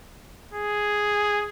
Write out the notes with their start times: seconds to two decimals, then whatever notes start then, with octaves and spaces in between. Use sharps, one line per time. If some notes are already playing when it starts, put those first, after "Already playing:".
0.54 G#4